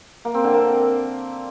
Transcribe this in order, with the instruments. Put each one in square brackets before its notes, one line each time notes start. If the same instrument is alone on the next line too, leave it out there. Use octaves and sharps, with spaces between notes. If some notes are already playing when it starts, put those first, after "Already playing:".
[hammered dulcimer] A#3
C4
D3
A#3